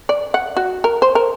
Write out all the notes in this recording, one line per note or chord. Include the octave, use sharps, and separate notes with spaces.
D5
F#5
F#4
A#4
C5
A#4